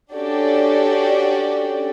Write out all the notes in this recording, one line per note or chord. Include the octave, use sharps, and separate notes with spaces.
C#4 D4 F#4 G4 A4 D5